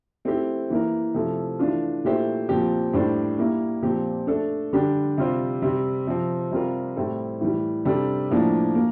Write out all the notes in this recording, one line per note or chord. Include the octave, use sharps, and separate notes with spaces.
A3 C4 E4 G4
E3 A#3 E4 A#4
C3 F3 A3 E4 A4
E3 A3 D4 F4
A#2 A3 E4 G4 C5
A#2 F3 C4 G4
A2 G3 D4 A4 C5
G3 A#3 E4
A#2 F3 C4 G4
A3 D4 A4
D3 G3 D4 G4
C3 G3 C4 F4 C5
C3 G3 C4
C3 F3 C4
C3 G3 C4 F4 A#4
A2 G3 C4 E4 A4
A2 E3 G3
C3 G3 D4 A4
A2 F3 A#3 D4
A#3